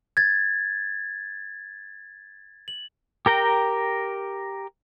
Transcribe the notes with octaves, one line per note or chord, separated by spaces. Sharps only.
G#6 A6
F#7
G4 A#4 G5 A#5